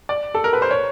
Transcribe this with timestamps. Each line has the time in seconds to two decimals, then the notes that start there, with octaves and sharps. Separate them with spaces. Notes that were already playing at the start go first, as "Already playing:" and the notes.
0.09 D5
0.34 A4
0.44 A#4
0.53 B4
0.62 C5
0.71 C#5